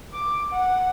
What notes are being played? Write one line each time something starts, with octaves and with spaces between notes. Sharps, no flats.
D6
F#5